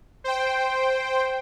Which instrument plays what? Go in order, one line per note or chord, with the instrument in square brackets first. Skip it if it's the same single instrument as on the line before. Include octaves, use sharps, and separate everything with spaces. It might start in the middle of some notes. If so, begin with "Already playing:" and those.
[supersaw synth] C5 G5